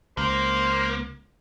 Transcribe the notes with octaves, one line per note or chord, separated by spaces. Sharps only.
C#2 A#3 C5